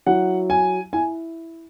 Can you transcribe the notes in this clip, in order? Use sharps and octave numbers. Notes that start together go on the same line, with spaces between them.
F#3 E4 F#5
G#5
E4 G#5